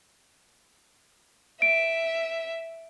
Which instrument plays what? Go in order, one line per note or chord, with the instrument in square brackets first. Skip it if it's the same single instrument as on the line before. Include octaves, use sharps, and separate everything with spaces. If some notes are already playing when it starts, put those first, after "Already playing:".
[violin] E5 [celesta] D7